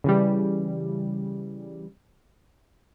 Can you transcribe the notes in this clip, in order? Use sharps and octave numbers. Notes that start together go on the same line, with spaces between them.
C#3 E3 G3